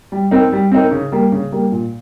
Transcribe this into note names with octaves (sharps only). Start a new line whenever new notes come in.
G3
C4 D#4 A#4
G3
C4 D#4 A#4
C#3
G3 A#3
C#3
G3 A#3
A#2